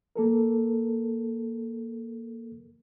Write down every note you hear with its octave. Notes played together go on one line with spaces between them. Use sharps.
A#3 A4 A#4